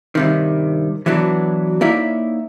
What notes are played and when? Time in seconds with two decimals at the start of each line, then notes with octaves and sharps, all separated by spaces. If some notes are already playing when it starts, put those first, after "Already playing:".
0.15 G2 C3 D#3
1.06 E3 F#3 B3 D4
1.81 A#3 D#4 E4 C#5 D5 E5